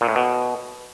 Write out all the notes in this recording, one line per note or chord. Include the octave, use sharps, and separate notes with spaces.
A#2
A2
B2